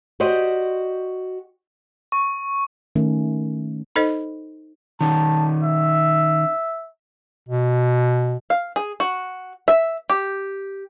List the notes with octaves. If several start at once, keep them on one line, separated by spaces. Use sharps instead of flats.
F#4 G4 C5 D5 D#5
C#6
D#3 A3 C#4
D#4 A4 C5 D#5
D#3 C#4 A5
E5
B2
F5
G#4
F#4
E5
G4